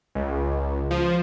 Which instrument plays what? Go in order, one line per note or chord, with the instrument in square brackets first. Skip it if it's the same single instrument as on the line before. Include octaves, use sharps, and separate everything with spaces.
[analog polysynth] C#2
F3